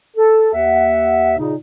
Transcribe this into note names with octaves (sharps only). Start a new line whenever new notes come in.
A4
D#2 E5 F#5
A#2 C#3 D#4